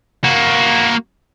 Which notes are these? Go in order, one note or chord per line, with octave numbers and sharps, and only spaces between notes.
A#3 F#4